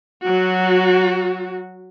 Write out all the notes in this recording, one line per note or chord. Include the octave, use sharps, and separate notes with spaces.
F#3 F#4